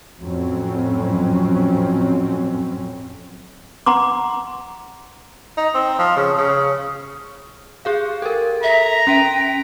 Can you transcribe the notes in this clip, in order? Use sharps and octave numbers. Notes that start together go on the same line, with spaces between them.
F2 A2 F#3 C4 C#4
F#5 A#5 C6 D6
D#4
C4
F3
C#3
C#3
G4 G#4 F5
A4 A#4
E5 A#5
C#4 G5 B6 D#7